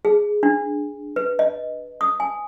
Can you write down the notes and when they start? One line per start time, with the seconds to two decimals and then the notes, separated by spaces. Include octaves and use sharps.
0.05 G#4
0.43 D4
1.16 B4
1.39 D#5
2.01 D#6
2.20 G#5